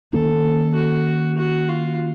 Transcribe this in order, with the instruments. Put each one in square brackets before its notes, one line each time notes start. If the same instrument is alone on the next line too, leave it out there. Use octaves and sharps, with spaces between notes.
[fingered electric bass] D#3 A#3 C#4 [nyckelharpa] A4
[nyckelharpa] F#4
F#4
F4